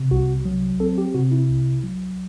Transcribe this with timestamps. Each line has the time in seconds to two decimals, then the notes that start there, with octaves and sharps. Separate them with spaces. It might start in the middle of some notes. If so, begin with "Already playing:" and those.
Already playing: C3
0.11 C2 F#4
0.45 F#3
0.80 C4 A4
0.98 G4
1.15 C3 F#4
1.32 E4
1.49 C2
1.84 F#3